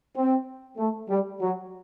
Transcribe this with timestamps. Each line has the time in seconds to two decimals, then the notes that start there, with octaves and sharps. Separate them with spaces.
0.16 C4
0.78 A3
1.08 G3
1.40 F#3